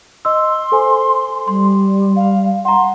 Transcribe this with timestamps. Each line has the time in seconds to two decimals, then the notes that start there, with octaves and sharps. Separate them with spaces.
0.25 D#5 C6 E6
0.72 A4 C5 G#5
1.48 G3 C6
2.16 F5
2.65 F#5 A#5 C6